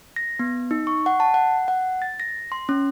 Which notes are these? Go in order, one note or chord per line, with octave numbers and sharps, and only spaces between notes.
A#6
B3
D#4
C#6
F#5
A5
F#5
F#5
A6
A#6
C6
C#4